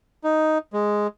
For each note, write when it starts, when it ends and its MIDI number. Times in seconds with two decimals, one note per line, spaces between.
0.24 0.58 63
0.73 1.07 56